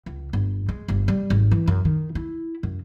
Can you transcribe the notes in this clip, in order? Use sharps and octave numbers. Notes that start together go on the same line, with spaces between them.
C#2
G1
G#3
G1
G3
G#1
E3
F#2
D#3
E4
F#2